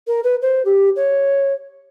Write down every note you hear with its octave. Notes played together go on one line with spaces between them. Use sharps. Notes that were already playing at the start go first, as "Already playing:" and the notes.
A#4
B4
C5
G4
C#5